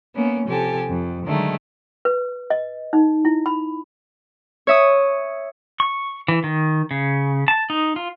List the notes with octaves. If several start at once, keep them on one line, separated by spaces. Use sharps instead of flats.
A#3 B3 C#4
C3 F3 G4 A4 G#5 A5
F2
D3 D#3 F#3 G#3 A3 D#4
B4
D#5
D#4
E4
B5
C#5 E5 D#6
C#6
E3
D#3
C#3
A5
D#4
F4